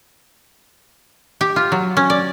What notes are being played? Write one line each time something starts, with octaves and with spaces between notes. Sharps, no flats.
G4
F4
F#3
C#4
D5